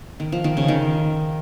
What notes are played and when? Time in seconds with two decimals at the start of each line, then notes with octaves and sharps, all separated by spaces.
0.20 D#3
0.32 F3
0.44 D#3
0.57 C#3
0.68 D#3